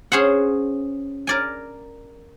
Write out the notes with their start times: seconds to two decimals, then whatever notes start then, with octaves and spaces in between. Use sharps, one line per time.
0.12 C#4 G#4 C5 F#5
1.27 A#4 D5 G#5